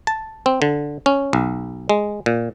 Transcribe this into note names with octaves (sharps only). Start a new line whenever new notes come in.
A5
C4
D3
C#4
B1
G#3
A#2